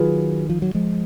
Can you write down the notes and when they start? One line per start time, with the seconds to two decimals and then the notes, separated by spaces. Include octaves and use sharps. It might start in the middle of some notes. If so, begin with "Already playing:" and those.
Already playing: D#3 F#3 F4 G#4 B4
0.50 F3
0.62 F#3
0.75 F3 G#3